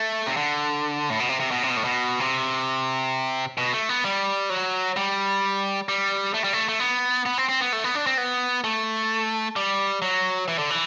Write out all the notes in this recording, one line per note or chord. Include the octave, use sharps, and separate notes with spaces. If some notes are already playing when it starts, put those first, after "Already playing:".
Already playing: A3
C3
D3
A2
B2
C3
C3
B2
C3
B2
A2
B2
C3
B2
A3
B3
G3
F#3
G3
G3
A3
G3
A3
A3
B3
B3
C4
C4
B3
A3
B3
D4
C4
B3
A3
G3
F#3
E3
D3
E3